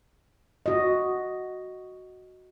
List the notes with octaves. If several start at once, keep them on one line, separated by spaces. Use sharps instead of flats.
F#4 D#5